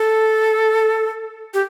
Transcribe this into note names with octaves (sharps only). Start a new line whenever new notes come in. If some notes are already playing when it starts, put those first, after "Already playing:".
Already playing: A4
G4